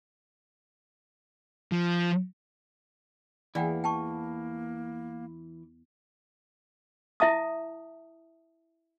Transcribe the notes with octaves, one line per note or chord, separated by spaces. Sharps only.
F3
E2 E3 A#3 D5 F#5 G5
G5 A5 C#6
E4 E5 A5 D#6